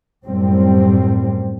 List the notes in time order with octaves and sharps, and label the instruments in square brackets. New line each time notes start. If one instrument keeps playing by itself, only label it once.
[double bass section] F#2 A2 G3 C4